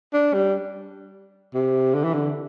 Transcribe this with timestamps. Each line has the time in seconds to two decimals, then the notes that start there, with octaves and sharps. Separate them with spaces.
0.13 D4
0.34 G3
1.54 C3
1.94 D3
2.04 E3
2.14 D3